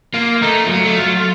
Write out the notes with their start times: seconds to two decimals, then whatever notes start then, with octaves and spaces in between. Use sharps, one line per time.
0.14 A#3 F4
0.42 A3 D#4
0.66 F3
0.71 F#3 F4
0.85 A3
1.00 F#3